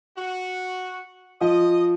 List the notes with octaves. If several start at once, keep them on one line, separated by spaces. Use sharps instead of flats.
F#4
F3 D#5